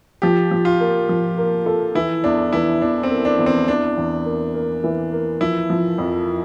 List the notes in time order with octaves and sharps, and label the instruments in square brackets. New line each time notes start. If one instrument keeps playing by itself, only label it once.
[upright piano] F3 [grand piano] G4
[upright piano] F3
[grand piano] F4
[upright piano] A#3
F3
A#3
A4
[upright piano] E3 [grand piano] E4
[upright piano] E2 [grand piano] D4
[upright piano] E3 [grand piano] E4
[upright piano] E2 [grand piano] D4
[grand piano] C4
[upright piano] A#3
[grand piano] D4
[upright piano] E2
[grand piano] C4
[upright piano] E3 [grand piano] D4
[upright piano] E2
A#3
A#3
E3
A#3
[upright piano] F3 [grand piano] E4
[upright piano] F3
F2